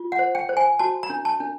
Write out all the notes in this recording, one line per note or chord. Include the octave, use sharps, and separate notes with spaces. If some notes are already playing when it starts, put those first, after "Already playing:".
Already playing: F4
F#5
C5
G5
C5
G#5
F#4 A5
A#5
D4
A5
D4